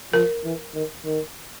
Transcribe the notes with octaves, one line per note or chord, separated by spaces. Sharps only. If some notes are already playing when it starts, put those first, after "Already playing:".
F3 A#4
E3
D#3
D#3